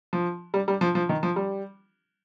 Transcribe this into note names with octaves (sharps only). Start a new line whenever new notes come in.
F3
G3
G3
F3
F3
D#3
F3
G3